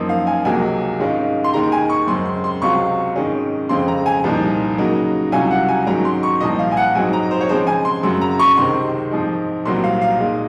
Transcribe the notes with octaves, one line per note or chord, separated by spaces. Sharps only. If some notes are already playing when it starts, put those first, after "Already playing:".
Already playing: F#2 F3 A#3 D#4
F5
G#5
C#2 C3 F#3 A#3 G#5
G#2 D#3 G#3 C#4 F4
C6
D#2 D#3 G#3 A#5
G#5
C#6
F#2 C#3 G#3 C4 C6
C6
C6
C#2 C3 F#3 C4 F4 C#6
G#2 D#3 G#3 C#4
F2 C#3 G#3 C4 F4 C6
A#5
G#5
C2 A#2 F3 A#3 D#4
C#3 F#3 A#3 D#4
C2 C3 F#3 C#4 F4 G#5
F#5
G#5
G#2 D#3 F#3 C#4 A#5
C6
C#6
C2 A#2 F3 D#5
F5
G#5
F#5
G#2 F#3 C4 D#4 G#5
A#5
C5
C#5
C#3 F3 G#3 C4 C5
G#5
C6
F#2 C#3 F#3 C6
A#5
C#6
C#2 C3 D#3 G#3 C4 C6
G#2 F3 C4 D#4
C2 A#2 F#3 C4 C6
F5
F5
A#2 G#3 D#4